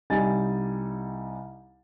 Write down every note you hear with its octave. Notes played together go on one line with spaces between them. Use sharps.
C2 G3 D#4 G#5 A6